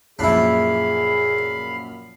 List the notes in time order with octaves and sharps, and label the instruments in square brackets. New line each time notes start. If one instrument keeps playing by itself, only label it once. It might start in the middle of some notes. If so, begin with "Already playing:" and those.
[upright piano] F#2 A#2 F3 [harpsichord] D4 E4 [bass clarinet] G#4 [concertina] F5 B5